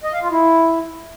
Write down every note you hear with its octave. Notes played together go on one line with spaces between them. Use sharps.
D#5
F5
F4
E4